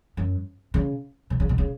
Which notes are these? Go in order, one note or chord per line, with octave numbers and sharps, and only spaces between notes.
F#2
C#3
B2
C#3
B2
C#3